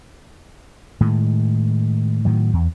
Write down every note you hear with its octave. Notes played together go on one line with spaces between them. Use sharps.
A2 D#3 G#3
A2 D#3 F#3
E2